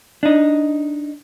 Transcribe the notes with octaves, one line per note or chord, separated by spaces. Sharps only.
D4 D#4